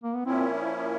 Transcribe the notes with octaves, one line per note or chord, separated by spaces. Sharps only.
A#3
B3
A#2 F3 A#3 C4 C#4 E4